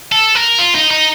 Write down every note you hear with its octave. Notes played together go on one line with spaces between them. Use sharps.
A4
A#4
F4
D#4
D#4